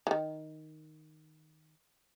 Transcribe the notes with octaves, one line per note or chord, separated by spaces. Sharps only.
D#3 E3